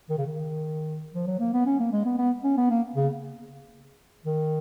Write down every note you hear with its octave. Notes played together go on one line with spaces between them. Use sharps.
D#3
C#3
D#3
F3
F#3
A#3
B3
C#4
A#3
G#3
B3
B3
C#4
B3
A#3
C#3
D#3